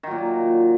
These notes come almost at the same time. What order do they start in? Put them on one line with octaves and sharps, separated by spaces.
D#3 F#3 A#2